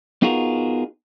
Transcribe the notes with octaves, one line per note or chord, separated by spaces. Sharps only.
B3 D#4 F4 F#4 G#4 A#4